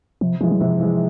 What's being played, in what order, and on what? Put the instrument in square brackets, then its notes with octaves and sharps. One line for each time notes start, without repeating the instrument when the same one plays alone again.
[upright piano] C3 [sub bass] F3
[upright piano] E3 G#3 [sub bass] F3
[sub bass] F#3
[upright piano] C3 [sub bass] F3
[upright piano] E3 G#3